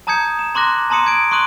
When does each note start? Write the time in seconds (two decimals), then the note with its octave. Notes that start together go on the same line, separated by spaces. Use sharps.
0.07 A5 A#5 D#6 G6 G#6 C#7
0.39 E7
0.55 A#5 C6 D6 F#6 A#6
0.90 A5 A#5 C6 D#6 C#7 D#7
1.06 G#6 D7
1.31 C6 C#6 D#6 F#6 D#7 F#7